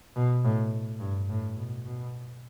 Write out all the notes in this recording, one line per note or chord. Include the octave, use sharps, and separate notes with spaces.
B2
A2
G2
A2
B2
B2